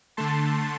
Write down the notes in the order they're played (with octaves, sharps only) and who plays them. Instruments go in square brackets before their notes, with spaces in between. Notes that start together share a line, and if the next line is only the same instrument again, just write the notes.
[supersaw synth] D3 A3 A5 C6